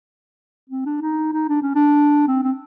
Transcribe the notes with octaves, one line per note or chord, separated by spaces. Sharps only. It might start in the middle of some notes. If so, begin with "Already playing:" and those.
C4
D4
D#4
D#4
D4
C#4
D4
C4
C4